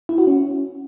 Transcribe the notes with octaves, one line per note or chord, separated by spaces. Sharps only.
E4
F#4
C#4